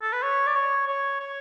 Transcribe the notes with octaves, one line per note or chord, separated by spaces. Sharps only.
A4
B4
C#5
D5
C#5
C#5
C#5